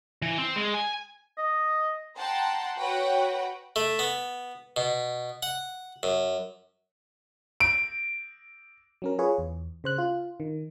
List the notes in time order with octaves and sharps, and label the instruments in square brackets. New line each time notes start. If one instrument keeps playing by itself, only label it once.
[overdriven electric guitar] E3
C4
G#3
G#5
[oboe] D#5
[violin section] F#5 G5 A5 A#5 C6
F#4 B4 C#5 F#5 G5
[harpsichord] A3
B3
B2
F#5
F#2
[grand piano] D7
[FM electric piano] F#3 C#4 A#4
F4 G#4 B4 C#5
E2
C#3 C5 F#6
F4
D#3